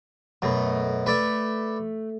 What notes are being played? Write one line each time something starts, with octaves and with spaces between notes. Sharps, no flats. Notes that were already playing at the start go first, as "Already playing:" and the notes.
F#2 B2 A3
A3 B4 D5 E5